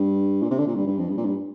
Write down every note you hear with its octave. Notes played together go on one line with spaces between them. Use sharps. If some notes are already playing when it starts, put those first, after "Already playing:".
Already playing: G2
A#2
C3
D3
A#2
G2
G2
F2
G2
A#2
G2